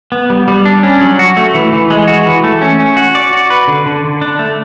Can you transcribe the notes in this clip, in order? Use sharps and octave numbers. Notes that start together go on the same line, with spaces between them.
B3
G3
G3
D4
C#4
F#3
F#4
A3
E3
E3
G#3
F#4
E3
A3
C#4
C#4
F#4
D5
F#4
B4
D3
D3
D3
D4
A3